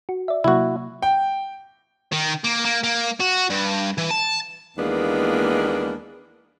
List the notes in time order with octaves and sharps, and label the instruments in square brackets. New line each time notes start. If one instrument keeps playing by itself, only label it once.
[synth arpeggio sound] F#4
D5 E5
[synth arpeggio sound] C3 F#3 A#3 [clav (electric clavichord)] E4 F#4
[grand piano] G5
[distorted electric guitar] D#3
A#3
A#3
A#3
F#4
G2
E3
A5
[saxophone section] D#2 E3 G#3 A#3 B3 D4